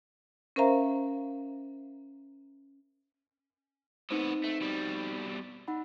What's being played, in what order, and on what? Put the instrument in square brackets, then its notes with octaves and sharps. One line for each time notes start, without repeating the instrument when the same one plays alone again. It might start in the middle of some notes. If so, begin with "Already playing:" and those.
[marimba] C#4 A#4 C5 E5 F5 A#5
[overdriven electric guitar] A2 B3 [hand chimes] C4 D#4 C5
[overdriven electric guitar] A3
B2 G3
[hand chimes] D#4 F#5 B5